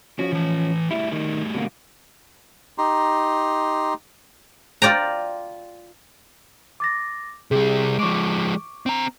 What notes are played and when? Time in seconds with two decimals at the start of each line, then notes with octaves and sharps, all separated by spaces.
0.19 F3 C#4 F#4
0.33 E3 A5
0.91 G3 A3 E4
1.12 D#3
1.55 B2 D3 A#3
2.78 D#4 G4 A#5 C6
4.82 F4 D5 G5 A#5
6.80 D6 A6 A#6
7.51 C3 G3 G#4
7.99 F3 G#3 C#6 D6 D7
8.86 C4 A#5